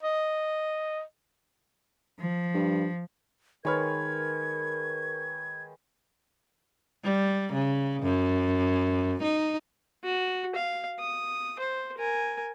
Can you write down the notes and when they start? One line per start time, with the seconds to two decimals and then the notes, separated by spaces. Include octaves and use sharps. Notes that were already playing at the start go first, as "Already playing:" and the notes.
0.03 D#5
2.19 F3
2.54 G2
3.65 D#3 G#3 A#4 B4 C#5 F6 G#6
7.04 G3
7.53 C#3
8.03 F#2
9.23 D#4
10.04 F#4
10.55 F5
10.99 D#6
11.59 C5
11.97 A#4 G#5